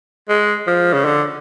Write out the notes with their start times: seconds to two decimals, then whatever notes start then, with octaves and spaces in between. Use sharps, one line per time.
0.29 G#3
0.67 F3
0.94 C#3
1.05 D3